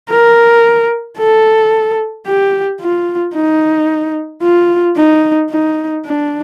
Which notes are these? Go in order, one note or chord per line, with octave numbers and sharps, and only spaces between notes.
A#4
A4
G4
F4
D#4
F4
D#4
D#4
D4